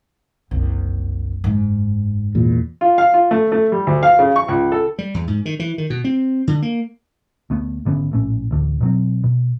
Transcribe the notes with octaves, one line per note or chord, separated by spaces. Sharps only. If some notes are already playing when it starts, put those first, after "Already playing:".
F#1 C2
G#2
E2 A#2
F4
F5
F4
A3
A3
G3
D2
F5
C#3
C#6
C#2
A4
G3
E2
G#2
D#3
E3
D#3
B2
C4
D3
A#3
D2 A3 B3
G#1 D3 B3 C#4
A#1 A2 C#4
A1 D2 D3
B2 F#3 C4
B2